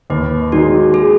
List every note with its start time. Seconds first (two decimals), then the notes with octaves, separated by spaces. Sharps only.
0.10 D#2 B4
0.52 D#3 G#3 D#4 F#4
0.94 G#4